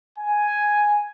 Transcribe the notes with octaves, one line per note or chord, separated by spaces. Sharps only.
G#5